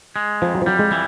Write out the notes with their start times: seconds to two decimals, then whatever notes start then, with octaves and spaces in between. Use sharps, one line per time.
0.16 G#3
0.42 F2 F3
0.55 F#3
0.62 F3
0.66 F#3 G3
0.79 G#3
0.92 E3